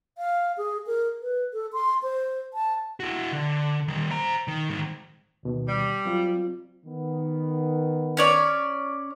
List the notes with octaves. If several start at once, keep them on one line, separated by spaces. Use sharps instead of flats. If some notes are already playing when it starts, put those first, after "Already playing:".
F5
G#4
A#4
B4
A4
C6
C5
A5
E4 F#4
D3
D#3 G3
C5 A#5
D#3
G#2 D#3
D2 B2 D#3
G3
F#3 C4 F4
D#3 B3
C#4 C#5 D5